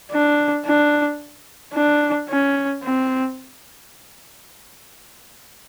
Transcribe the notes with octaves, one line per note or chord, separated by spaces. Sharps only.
D4
D4
D4
C#4
C4